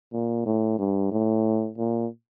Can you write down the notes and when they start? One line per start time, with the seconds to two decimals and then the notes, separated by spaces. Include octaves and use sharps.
0.13 A#2
0.46 A2
0.78 G2
1.11 A2
1.78 A#2